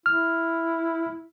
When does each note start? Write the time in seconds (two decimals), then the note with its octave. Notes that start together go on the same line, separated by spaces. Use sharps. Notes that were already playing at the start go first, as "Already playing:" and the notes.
0.06 E4 F6